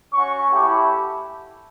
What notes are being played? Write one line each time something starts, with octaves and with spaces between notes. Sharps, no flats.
C#4 F#4 C#6
A3 E4 G4